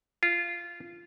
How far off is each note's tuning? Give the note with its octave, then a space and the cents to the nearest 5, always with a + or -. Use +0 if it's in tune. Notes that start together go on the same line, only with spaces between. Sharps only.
F4 -15